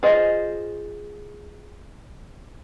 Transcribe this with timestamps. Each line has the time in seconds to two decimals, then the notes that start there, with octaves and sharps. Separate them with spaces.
0.03 F4 G#4 C5 D#5